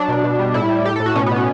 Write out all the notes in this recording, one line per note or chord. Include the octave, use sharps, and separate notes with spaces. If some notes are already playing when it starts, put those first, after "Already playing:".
Already playing: F#3 D4
B2
B2
G3
A2 E4
G3
A2 G4
A4
A2
F#4
B2 C#4
B3
B2
C#4